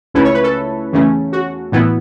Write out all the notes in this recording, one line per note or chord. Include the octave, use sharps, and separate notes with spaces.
C#2 C#3 A3 C#4 E4 B4
C#5
B4
A4
E2 C#3 A3 C#4
F#4
A2 E3 B3 E4